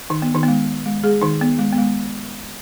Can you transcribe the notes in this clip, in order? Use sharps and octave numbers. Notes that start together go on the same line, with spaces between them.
D#3 D#4
B3
D#3 D#4
B3
G#3
G#3
G#3 G#4
D#3 D#4
B3
G#3
B3
G#3